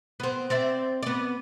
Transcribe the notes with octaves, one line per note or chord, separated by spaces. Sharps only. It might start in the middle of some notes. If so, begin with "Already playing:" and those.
B3 C4
C4 D5 E5
B3 D5